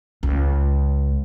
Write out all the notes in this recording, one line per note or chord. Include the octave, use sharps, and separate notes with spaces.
C#2